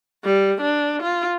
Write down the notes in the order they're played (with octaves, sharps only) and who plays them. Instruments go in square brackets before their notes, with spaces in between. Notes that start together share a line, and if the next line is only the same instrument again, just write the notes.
[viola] G3
D4
F4